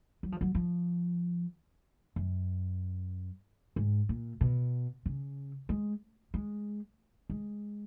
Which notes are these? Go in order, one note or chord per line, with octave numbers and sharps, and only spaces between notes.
F#3
F3
F#3
F3
F#2
G#2
A#2
B2
C#3
G#3
G#3
G#3